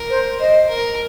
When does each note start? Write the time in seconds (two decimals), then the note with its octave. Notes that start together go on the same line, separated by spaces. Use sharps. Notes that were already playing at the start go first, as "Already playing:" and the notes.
Already playing: A#4
0.10 C5
0.40 C5 D#5
0.69 A#4